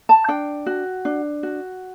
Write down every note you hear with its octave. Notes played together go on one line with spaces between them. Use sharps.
A5
D4 G5
F#4
D4
F#4